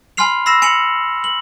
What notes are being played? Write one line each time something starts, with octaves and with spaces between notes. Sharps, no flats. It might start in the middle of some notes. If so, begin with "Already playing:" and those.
G#5 B5 C6 F6 C7 F7
B5 E6 A#6 C7 E7
G#5 C#7 F7 F#7
F#7